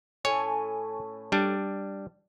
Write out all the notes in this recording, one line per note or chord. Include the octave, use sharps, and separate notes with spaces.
A2 C#4 C#5 G#5
G3 D4